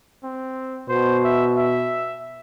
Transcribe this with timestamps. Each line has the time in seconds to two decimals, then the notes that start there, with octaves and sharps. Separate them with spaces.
0.24 C4
0.89 B2 C5
1.24 E5
1.57 E5